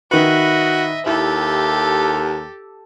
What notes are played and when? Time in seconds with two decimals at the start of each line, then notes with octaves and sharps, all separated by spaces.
0.11 D#3 F#4 B4 D#5 E5
1.06 D#2 E4 G4 A4